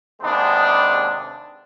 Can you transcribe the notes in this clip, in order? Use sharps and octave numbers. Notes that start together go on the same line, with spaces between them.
D#2 C3 G#3 B3 D4